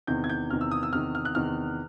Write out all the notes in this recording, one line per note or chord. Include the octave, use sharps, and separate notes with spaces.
E2 C3 D#3 G6
G#6
G6
E2 C3 D#3 F6
E6
D#6
E6
E2 C3 D#3 F6
F6
F#6
E2 C3 D#3 F6